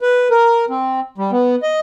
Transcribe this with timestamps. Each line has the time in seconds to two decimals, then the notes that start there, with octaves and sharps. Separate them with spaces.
0.01 B4
0.31 A#4
0.70 C4
1.18 G3
1.32 B3
1.63 D#5